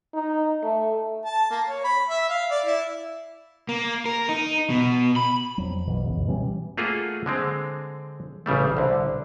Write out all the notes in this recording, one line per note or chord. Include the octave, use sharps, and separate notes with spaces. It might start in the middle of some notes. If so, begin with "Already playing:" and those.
D#4
A3
A5
A#3
C#5
B5
E5
F5
D5
E4
A#3
A#4
D#4
B2
B5
F2 F#3
A#1 B2 E3
C#2 F#2 B2
B2 E3 G3 C#4
A3 A#3 F4 F#4 G#4
D3 G#3 C4
A1 C#3 G3 A3
C2 D3